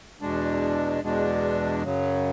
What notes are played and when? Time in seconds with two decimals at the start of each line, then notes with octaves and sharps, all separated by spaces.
0.21 E2 B2 G#3 D4
1.02 E2 B2 G#3 D4
1.82 F#2 C#3 F#3